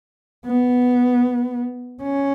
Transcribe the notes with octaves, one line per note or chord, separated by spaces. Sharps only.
B3
C#4